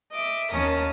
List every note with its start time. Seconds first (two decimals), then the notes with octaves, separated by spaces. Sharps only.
0.10 D#5 E5 D6
0.51 D#2 C#4 A#4 A5 D#6